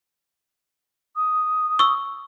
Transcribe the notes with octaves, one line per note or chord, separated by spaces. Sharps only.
D#6
C#6 E6